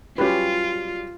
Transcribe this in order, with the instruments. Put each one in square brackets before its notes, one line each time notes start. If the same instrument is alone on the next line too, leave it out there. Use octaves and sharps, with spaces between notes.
[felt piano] F#3 G3 [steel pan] C#4 G4 B4 [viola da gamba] F4